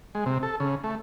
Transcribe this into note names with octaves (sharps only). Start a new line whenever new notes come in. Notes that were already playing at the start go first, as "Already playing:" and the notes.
G#3
C3
A4
C#3
A3